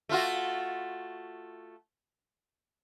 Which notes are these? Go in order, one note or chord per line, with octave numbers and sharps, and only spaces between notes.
A3 F4 F#4